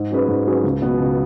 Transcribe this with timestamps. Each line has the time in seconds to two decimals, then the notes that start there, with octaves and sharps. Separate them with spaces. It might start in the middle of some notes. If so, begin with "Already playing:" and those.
Already playing: G#2
0.11 F#3 C#4 G#4 B4
0.28 G#2
0.46 F#3 C#4 G#4 B4
0.64 C#2
0.82 B2 F#3 B3
1.00 C#2